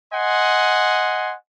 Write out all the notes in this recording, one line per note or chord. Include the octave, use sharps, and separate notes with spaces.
D#5 F#5 G#5 C6